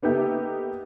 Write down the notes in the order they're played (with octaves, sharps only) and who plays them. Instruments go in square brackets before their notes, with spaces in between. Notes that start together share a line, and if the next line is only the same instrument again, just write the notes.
[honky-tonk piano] A#3 B3 D#4 G4 A4 E5